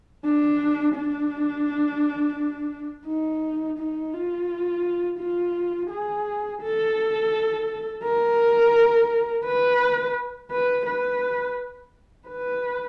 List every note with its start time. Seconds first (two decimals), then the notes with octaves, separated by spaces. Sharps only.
0.24 D4
0.95 D4
3.07 D#4
3.78 D#4
4.14 F4
5.19 F4
5.90 G#4
6.61 A4
8.03 A#4
9.45 B4
10.51 B4
10.86 B4
12.28 B4